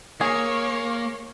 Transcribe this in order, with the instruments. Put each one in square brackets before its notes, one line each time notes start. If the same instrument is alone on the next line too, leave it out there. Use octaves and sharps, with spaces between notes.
[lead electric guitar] A#3 [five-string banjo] G#4 [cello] C#5